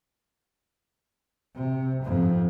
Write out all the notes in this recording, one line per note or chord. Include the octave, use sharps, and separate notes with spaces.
C3
F2 G#2